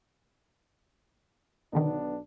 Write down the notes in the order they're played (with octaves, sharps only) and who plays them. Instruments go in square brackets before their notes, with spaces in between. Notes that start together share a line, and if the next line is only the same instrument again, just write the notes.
[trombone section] B1 B3 D4 [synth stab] B2 D3 D#3